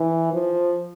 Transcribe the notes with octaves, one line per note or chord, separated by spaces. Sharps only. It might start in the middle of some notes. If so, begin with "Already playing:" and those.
Already playing: E3
F3